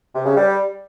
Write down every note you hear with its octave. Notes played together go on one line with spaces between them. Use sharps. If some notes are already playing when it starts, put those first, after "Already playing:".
C3
C#3
G3